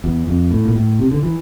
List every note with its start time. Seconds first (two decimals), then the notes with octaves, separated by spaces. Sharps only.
0.04 E2
0.28 F2
0.51 A2
0.65 A#2
0.75 A2
0.99 C3
1.11 D3
1.23 E3